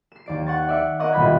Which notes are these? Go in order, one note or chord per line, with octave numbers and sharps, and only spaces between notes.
C7 E7
D#2 D5 D7
F#5 C#6 A6
D5 E5 C#7
A#4 C#5 D#5 F#5 C#6 D6
D#1 B1 D#5 B5 G#6